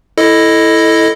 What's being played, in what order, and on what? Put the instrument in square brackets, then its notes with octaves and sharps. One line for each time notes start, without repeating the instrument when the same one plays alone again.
[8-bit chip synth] E4 A4 D#5